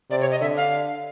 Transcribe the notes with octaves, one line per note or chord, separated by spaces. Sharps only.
C3 D5
C#5
D#5
D3 E5
F5